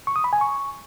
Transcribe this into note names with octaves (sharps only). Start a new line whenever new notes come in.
C#6
D#6
B5
G#5
C#6